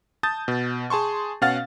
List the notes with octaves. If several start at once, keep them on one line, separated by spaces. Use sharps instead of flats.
A5 D#6 G6 A6
B2
G#4 A5 C6 C#6
B2 C#4 F5 F#5 F6 A6